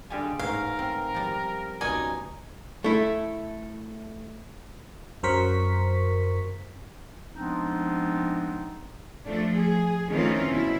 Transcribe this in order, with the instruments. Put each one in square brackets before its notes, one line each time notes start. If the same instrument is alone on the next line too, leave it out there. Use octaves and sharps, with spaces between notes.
[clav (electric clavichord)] D3 G4 G#5 [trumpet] G3 [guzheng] F4 G#4 D#5
[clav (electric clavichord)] A1 G#2 [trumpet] A#4 [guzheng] C#5 [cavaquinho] F5
[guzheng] C4
F3 G3
[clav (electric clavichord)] C#2 B2 D5 [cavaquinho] D#4 G#5
[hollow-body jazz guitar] A3 E4
[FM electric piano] F#2 F#3 A#4 C5 C#6 B6
[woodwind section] F3 G#3 B3 C4 D4 D#4
[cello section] F3 A3 D4
G#4
D#3 E3 A3 C4 C#4 F4
B2 E4